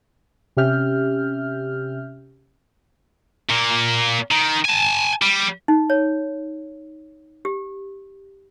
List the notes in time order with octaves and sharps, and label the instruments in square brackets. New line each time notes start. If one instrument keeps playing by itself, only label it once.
[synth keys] C3 C#4 G4 E5 F6 G6
[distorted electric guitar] A#2 A#3
D#3
G#5 A5
G3
[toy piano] D#4
C#5
G4